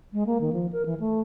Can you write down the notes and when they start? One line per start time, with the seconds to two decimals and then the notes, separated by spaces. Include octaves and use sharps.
0.13 G#3
0.27 A#3
0.41 D#3
0.53 F3
0.73 A#4
0.86 E3
1.00 A3